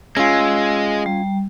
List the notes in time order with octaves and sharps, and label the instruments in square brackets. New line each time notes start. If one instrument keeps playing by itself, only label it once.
[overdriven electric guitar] G#3 [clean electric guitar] C#4 F4 [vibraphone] G#5 E6
[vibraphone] G3